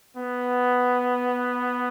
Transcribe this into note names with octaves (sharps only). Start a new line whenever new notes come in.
B3